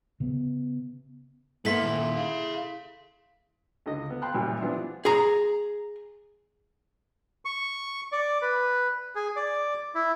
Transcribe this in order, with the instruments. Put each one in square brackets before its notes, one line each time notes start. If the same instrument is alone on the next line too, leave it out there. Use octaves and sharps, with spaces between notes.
[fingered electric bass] C#3 B3
[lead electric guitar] A#3 B3 [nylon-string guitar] E4 A4 [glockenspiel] C6 B6 F#7
[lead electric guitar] D#2 A#2
G#4 F5
[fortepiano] C#2 D3 D#5
B3
F5 G5 A5 B5 C6 F#6
A1 F#2 A#2 G3
E3 F3 B3 D4 E4 F4
[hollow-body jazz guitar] G#4 A#5
[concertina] C#6
D5
B4
G#4
D5
E4